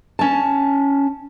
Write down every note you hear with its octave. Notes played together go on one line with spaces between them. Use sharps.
C#4 A5